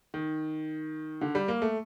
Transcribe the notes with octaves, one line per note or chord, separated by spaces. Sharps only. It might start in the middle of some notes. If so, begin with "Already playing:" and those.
D#3
D3
G3
A#3
A3